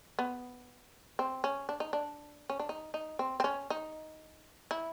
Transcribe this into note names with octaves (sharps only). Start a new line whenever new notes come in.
B3
C4
C#4
D4
D#4
D4
C#4
D4
D#4
D#4
C4
C4
C#4
D#4
E4